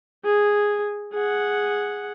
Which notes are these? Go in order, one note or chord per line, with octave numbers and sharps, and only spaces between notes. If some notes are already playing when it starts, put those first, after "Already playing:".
G#4
G#4 F#5